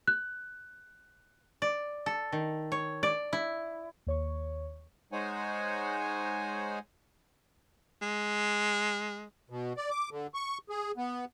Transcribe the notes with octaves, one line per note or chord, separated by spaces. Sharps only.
F#6
D5
A4
D#3
C#5
D5
E4
D#2 C#5 C#6
G#3 D#4 C5 C#5 F#5 G#5
G#3
B2
D5
D6
D3
C#6
G#4
B3